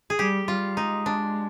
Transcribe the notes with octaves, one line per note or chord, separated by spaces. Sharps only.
G#4
G3 G4
G3 F4
G#3 D#4
D4